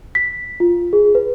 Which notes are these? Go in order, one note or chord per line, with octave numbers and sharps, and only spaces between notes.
B6
F4
G#4
B4